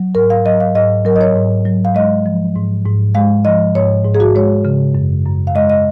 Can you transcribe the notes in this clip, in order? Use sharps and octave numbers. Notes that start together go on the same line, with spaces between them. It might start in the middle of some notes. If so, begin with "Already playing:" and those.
Already playing: F#3
G#2 A#4
F5
F#3 D#5
F5
G#2 D#5
F#3 A#4
D#5
C#5
G#2
F#3
F5
G#3 D#5
F3
G#2
G#2
G#3 F5
F3 D#5
G#2 C#5
G#2
G#4
F#4
G#3 C#5
C#3
F#2
F#2
F5
G#3 D#5
D#5